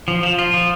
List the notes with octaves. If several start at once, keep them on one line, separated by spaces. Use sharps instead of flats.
F3
F3
F4
F3